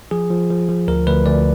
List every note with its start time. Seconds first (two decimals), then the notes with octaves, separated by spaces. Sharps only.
0.11 F3 G#4
0.31 F3
0.50 F3
0.69 F3
0.88 D2 A#4
1.07 D2 B4
1.26 D2 D5